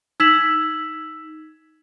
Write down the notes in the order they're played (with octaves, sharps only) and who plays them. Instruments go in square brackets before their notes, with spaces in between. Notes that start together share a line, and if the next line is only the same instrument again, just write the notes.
[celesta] D#4 E6 G#6 B6 E7 F#7